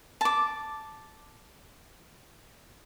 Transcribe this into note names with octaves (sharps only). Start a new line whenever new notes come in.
A5 D6